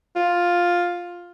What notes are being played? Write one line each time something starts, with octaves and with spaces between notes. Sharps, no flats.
F4